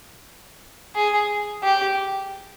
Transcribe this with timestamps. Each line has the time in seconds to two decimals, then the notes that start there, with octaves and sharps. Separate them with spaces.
0.95 G#4
1.63 G4